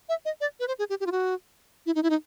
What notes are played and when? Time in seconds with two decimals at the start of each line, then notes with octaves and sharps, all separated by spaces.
0.09 E5
0.25 D#5
0.41 D5
0.60 B4
0.68 C5
0.79 G#4
0.90 G4
1.00 G4
1.07 F4
1.12 F#4
1.86 E4
1.95 D#4
2.03 E4
2.10 D#4